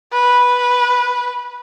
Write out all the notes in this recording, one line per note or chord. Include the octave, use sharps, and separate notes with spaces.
B4